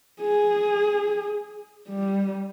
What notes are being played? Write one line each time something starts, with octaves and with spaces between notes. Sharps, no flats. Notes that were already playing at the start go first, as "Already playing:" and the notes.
G#4
G3